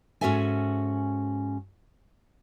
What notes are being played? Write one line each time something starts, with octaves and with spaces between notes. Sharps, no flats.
G#2 C#4 F#4 A4 E5 G#5